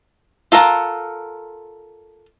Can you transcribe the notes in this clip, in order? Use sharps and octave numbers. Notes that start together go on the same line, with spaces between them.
F4 A4 A#4 F5 F#5